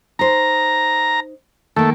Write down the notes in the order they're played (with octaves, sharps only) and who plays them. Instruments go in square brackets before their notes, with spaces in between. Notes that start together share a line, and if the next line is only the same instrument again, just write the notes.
[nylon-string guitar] D#4 C5 [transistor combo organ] A#5
[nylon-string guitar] D#3 A#3 [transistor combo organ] A3